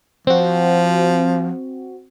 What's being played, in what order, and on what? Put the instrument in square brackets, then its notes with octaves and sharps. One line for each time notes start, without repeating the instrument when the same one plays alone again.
[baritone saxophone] F3 [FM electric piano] C4 F#4